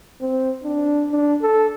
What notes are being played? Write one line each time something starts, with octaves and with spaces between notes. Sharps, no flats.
C4
D4
D4
A4